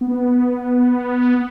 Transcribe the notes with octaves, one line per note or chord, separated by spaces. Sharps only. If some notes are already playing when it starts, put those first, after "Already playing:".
B3